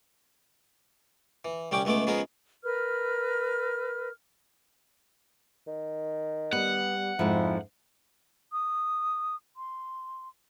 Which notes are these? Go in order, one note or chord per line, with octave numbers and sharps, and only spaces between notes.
E3
C2 G3 C#4 G5 D6
C#2 G#3 A3 B3 D6
C#3 F3 G#3 B3 G#4 A#4
A#4 B4 F6
D#3
G3 B3 F#5
F2 G#2 F3 E4
D#6
C6